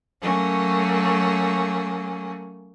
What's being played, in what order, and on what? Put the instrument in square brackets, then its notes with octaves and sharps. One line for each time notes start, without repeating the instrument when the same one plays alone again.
[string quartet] F#3 A3 A#3 C#4